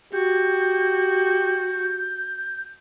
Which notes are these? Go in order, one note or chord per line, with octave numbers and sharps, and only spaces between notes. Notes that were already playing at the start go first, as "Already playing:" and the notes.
F#4 G4 G6